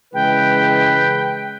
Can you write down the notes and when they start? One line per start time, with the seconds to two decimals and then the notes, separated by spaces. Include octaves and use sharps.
0.14 C#3 E3 G#3 B4 G5